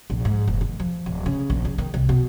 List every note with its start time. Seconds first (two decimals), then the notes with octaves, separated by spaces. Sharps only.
0.10 A#1
0.25 G#2
0.48 F1
0.61 D#3
0.80 F3
1.06 D1
1.26 C#3
1.50 A#1
1.65 C#3
1.78 D#3
1.94 C2
2.09 B2